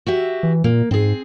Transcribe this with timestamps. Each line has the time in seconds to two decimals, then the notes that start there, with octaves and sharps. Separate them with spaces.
0.06 F#4 G4 E5
0.43 E3
0.64 A#2 A#3
0.91 G#2 C4 G#4